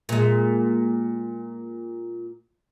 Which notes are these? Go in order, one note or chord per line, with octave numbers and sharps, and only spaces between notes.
A#2 G#3